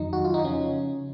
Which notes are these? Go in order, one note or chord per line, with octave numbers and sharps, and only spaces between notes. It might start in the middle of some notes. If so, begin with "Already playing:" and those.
Already playing: F2 D#3 F#3 D#4
F#4
F4
D#4
C#3 F3 C#4